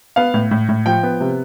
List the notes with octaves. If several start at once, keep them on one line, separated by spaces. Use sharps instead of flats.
B3 F5
A2
A2
A2
F3 G5
B3
C3